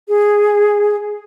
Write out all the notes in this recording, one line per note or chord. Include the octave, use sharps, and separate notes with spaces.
G#4